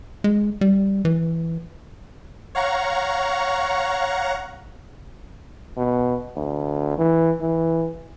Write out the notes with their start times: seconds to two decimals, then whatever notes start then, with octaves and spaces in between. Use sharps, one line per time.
0.24 G#3
0.61 G3
1.05 E3
2.55 C#5 F5 F#5 A#5 C#6
5.77 B2
6.36 D2
6.98 E3
7.41 E3